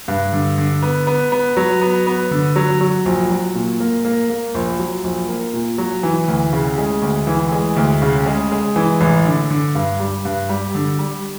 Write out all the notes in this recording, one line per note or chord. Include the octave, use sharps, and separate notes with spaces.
G2
D3
D3
B3
B3
B3
F#3
B3
B3
D3
F#3
F#3
A#1
F#3
A#2
A#3
A#3
A#3
A#1
F#3
A#1
A#3
A#2
F#3
E3
D2
C#3
G#3
D2
E3
G#3
D2
C#3
G#3
G#3
E3
A1
D3
D3
G2
G3
G2
G3
D3
G3